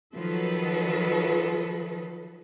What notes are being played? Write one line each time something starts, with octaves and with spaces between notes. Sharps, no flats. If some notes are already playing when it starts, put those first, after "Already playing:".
D#3 F3 F#3 A4 B4